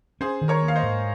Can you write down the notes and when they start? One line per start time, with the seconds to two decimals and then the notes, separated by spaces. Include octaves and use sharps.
0.21 C#4 G#4 C5
0.41 D#3
0.48 A#4 C#5
0.62 A#3
0.68 F5
0.76 C5 D#5
0.83 G#2